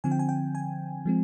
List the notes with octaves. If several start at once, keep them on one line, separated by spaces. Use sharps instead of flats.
D3 F3 C4 G#5
G5
G#5
G5
G#5
F3 G#3 C4